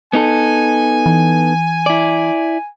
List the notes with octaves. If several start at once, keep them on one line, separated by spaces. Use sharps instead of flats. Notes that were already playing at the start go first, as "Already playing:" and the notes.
B3 D#4 A4 G#5
E3
E4 D5